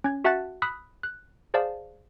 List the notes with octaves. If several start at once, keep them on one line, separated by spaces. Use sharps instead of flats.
C#4 G#6
F#4 E5 F#5 A5 F#6 A6
B5 D#6 E6 F#6 B6
F#6
G#4 C5 D5 F5 A5